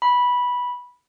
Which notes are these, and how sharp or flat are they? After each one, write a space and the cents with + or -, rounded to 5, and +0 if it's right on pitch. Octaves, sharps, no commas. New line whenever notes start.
B5 -10